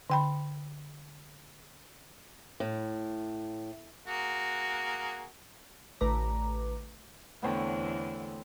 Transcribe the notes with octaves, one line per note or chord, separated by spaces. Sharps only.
D3 G5 B5
A2
A#3 F#4 G#4
A1 D3 A3 B4 A#5 D6
E2 D3 A3 B3 C4 C#5 A5